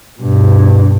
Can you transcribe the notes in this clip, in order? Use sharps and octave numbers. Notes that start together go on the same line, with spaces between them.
G2 B2